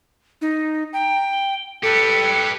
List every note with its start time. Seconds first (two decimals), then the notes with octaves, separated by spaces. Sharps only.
0.42 D#4
0.93 G5 A#5
1.32 G7
1.83 G4 A4 B4 C#7